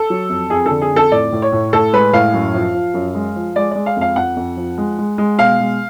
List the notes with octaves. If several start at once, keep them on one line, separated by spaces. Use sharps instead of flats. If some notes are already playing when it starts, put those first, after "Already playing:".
Already playing: A4
F#3
F2
F2 G#4
D3 A4
G#4
F2 A4
A2 D5
A2
C#5
A2
A2 A4
G#3 B4
A2 F5
F#2
F3
F3
F#2
G#3
F3
G#3 D5
G#3 D5
F5
F2 F5
F2 F#5
F2
F3
G#3
G#3
G#3
B2 F5
G#3